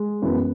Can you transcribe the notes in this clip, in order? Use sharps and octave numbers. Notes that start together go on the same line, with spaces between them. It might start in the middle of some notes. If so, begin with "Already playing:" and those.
Already playing: G#3 G#4
F#2 E3 B3